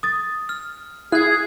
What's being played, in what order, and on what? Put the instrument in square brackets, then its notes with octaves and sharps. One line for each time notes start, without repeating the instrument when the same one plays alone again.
[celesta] D#6 A6
[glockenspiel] F6
[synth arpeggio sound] E4 [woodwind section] G#4 [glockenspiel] F#6 G#6